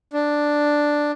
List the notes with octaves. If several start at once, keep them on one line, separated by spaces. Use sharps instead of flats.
D4